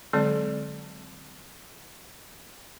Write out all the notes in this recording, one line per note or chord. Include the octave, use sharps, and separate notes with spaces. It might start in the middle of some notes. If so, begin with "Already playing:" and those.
D3 F#3 G#3 C4 D5